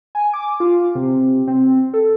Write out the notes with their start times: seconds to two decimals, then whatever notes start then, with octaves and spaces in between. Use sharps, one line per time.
0.15 G#5
0.34 D6
0.60 F4
0.95 C3
1.48 C4
1.94 A4